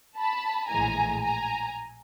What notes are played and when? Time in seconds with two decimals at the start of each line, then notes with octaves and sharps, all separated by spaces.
0.18 A5 B5
0.70 A#1 A2 E3 G#3 G#5 A#5
1.22 G#5 A#5